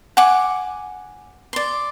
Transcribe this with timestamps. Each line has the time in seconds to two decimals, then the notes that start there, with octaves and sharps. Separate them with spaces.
0.17 F#5 G#5 D6
1.53 D5 C6